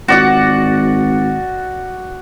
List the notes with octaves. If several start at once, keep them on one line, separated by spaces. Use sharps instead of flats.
G#1 F#4 D5 F#5